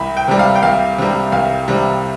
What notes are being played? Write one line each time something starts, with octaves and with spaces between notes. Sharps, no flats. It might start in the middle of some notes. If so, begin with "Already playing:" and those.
Already playing: C2 B5
G5
C3 G3
F5
G5
C2 F5
C3 G3
C2 F5
C3 G3